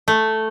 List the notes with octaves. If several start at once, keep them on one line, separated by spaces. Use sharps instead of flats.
A3